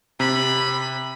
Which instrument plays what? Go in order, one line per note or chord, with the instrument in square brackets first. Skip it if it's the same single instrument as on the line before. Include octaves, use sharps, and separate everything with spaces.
[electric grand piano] C3 [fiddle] B5